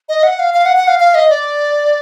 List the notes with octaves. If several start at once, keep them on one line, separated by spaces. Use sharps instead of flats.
D#5
F#5
F5
F5
F#5
F#5
F5
F5
D#5
D5